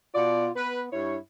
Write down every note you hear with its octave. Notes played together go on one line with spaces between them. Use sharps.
B2 F4 D5
B3 B4
G2 E4 C#5